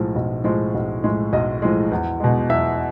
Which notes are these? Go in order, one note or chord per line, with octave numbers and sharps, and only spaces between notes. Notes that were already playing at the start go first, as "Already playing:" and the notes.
Already playing: B1 A2 F3 G#3
B1
A2 F3 G#3
B1
A2 F3 G#3
B1 D#5
A2 F3 G#3
E2
B2 G#3
E2 E5